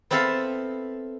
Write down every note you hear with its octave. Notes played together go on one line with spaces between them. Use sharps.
B3 C4 E4 A4 E5 F5